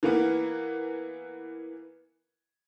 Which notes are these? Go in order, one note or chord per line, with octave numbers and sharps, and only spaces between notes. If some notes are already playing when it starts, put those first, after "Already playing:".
E3 A#3 B3